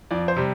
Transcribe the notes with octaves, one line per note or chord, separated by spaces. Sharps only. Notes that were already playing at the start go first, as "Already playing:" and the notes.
F2 D5
C5
C3 G3